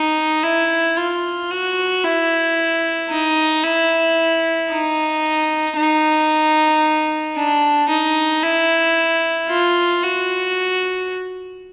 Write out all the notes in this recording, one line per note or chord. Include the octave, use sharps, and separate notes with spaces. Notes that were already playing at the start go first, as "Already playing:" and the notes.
Already playing: D#4
E4
F4
F#4
E4
D#4
E4
D#4
D#4
D4
D#4
E4
F4
F#4